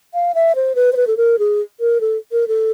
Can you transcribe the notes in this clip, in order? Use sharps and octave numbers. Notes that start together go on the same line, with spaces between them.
F5
E5
C5
B4
C5
B4
A4
A#4
G#4
A#4
A4
A#4
A4